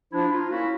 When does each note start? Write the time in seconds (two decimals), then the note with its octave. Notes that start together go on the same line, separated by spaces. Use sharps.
0.12 F3 D4 E4
0.32 D#4 F4
0.50 A#3 C#4 E4 F#4